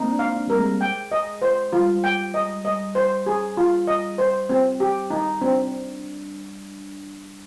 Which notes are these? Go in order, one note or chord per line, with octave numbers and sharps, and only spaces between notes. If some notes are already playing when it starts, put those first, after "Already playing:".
Already playing: G#3 A#3 C4 D#4
D4
F5
D4
G3 A#4
G#3
G5
D#5
C5
G3 F4
G5
D#5
D#5
C5
G#4
F4
D#5
C5
C4
G4
D#4
C4 D4